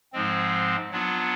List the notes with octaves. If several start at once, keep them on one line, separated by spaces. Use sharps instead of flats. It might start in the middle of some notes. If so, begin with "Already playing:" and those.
G#2 F3 G#3 C4
F#3 B3 D4 F4